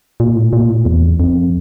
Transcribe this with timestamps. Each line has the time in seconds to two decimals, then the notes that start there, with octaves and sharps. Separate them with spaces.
0.20 A#2
0.36 A2
0.53 A#2
0.70 A2
0.85 E2
1.20 F2